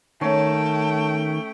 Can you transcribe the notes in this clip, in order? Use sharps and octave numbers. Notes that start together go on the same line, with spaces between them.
D#3 A3 C#4 G5 A5